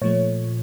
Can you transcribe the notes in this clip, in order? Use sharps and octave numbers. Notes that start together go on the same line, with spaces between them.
A#2 F3 A3 C#5